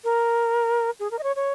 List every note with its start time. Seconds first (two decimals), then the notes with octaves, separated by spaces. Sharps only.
0.04 A#4
1.00 G#4
1.11 A#4
1.19 D#5
1.23 C#5
1.36 C#5